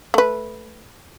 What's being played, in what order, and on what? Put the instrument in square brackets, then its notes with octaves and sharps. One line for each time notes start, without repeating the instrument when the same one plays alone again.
[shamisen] A3 B4